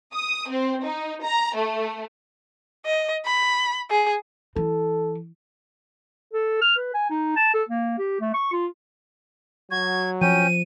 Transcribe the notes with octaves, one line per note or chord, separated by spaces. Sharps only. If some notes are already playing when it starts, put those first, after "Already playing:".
D#6
C4
D#4
A#5
A3
D#5
B5
G#4
E3 A4
A4
F6
B4
G#5
D#4
A5
A4
A#3
G4
A3
C#6
F4
F#3 F#4 G#6
F3 C#4 G5 D#7